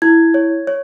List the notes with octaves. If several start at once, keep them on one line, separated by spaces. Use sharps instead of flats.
E4 G#6
C#5
C#5